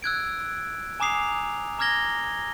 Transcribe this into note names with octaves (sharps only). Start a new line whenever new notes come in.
E6 F#6 G#6 D7
G#5 A#5 D6 D#6 C7 F7
A#5 D6 F6 G#6 A#6 G7